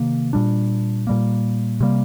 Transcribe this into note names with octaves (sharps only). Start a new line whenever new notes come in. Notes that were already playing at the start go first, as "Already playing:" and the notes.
Already playing: C3 D#3 A#3
A#2 G3 D4
A#2 G3 A#3
C3 G3 A#3